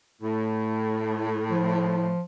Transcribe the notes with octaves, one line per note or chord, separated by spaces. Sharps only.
A2
F3